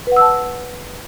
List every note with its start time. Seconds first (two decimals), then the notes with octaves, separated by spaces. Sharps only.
0.07 B4
0.12 F#5
0.17 E6
0.21 A5